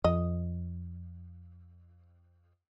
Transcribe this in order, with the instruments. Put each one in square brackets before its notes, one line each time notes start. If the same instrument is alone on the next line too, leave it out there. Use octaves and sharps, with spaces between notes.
[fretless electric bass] F2 [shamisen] D#5